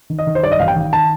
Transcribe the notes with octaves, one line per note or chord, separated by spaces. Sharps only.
D#3
D#5
D#3
C5
G2 D5
D#5
A1 F5
G5
D#3
D#3 A5